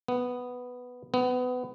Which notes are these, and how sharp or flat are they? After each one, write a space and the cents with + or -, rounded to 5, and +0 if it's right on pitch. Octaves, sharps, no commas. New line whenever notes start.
B3 +5
B3 +25